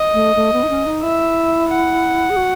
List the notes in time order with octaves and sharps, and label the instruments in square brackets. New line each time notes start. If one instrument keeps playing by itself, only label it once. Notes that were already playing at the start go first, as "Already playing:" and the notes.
Already playing: [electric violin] D#5
[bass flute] A3
A3
B3
D#4
C#4
D#4
[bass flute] E4 [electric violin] E5
[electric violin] F#5
[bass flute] G#4
F#4